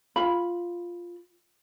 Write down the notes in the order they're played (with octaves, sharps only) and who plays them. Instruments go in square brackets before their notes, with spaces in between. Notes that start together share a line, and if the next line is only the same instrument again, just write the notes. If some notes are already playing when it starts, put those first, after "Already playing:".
[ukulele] F4 B5